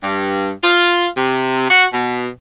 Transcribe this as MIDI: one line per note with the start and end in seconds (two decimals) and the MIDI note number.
0.02 0.51 43
0.62 1.06 65
1.16 1.68 48
1.70 1.85 66
1.93 2.28 47